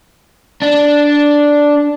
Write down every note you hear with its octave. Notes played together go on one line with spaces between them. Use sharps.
D4